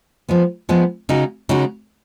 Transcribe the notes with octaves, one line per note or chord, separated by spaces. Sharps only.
F3 G#3 B3
F3 G#3 B3
C#3 G#3 D#4 F#4
C#3 G#3 D#4 F#4